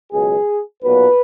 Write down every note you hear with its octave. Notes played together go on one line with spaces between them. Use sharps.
C#2 B2 F#3 G#4
B1 A#2 F#3 B3 B4